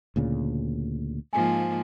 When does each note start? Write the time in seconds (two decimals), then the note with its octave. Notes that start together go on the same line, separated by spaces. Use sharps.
0.16 D2 A#2 C#3
1.33 G#2 F3 A#3 G#5